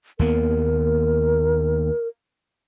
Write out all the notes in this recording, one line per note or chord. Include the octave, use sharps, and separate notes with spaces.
D#2 A#3 B3 A#4